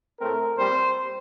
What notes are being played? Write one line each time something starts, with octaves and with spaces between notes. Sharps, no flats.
A2 A3 C4 A#4
A#2 G3 C4 C5